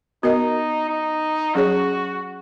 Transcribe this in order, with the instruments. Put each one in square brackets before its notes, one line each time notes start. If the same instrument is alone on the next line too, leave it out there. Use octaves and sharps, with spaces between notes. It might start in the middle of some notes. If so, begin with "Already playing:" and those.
[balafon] B3 F#4 A#4 D#5 [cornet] D#4
[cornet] D#4
[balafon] F#3 C#4 G#4 C#5 [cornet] F#4